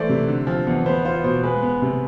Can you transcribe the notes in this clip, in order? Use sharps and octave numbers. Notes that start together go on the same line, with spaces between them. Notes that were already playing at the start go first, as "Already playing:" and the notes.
Already playing: E3 A3 C5 D5
C3
D3
F3
E2
B3 C5
F4 C5
B2 C5
G#3 B4
B3
C3